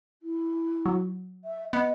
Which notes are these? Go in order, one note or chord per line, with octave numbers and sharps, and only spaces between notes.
E4
F#3
E5
B3 D#5